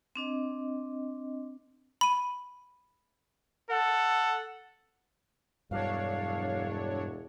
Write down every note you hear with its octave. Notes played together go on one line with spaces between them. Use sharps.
C4 D4 D#5
B5 D#7
A4 F#5
E1 G2 F#3 D4 C#5 F5